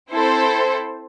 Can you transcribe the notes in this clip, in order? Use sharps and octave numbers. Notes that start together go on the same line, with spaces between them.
C4 E4 A4 C5